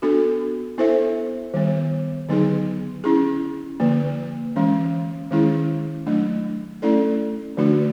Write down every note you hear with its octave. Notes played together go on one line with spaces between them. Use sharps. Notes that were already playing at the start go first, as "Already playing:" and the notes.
B3 D4 F#4 A4
B3 E4 A4 C5 E5
D#3 G3 B3
D3 F#3 B3 D#4 G#4
C#4 E4 G#4
D3 F3 A#3
E3 G#3 C#4
D#3 G#3 C#4 E4 G#4
F#3 A3 D4
A3 C#4 E4 A4 D5
D3 F3 A3 D4 F#4